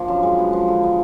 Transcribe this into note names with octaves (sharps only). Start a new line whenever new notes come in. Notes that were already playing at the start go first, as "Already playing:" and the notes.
Already playing: F3 A#3 D4
F#2
G#3
B3
F3
D3
B3